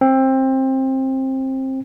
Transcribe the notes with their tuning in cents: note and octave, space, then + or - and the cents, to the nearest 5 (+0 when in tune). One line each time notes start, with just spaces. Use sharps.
C4 +20